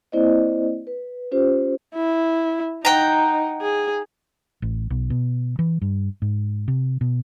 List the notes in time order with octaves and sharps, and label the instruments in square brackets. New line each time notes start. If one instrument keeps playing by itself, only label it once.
[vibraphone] A#3 C4 E4 C5 D5 D#5
B4
C#4 F4 G4 C5
[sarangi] E4
[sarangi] D#4 [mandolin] F#5 G5 A#5
[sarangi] G#4
[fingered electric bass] A1
B1
B2
E3
G2
G#2
C3
B2